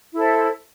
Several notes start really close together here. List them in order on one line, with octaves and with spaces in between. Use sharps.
E4 A4 C5